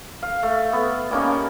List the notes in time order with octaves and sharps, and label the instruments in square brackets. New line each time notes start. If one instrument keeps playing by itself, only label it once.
[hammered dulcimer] F5
A3
B3
G3 A#3 C#4 D#4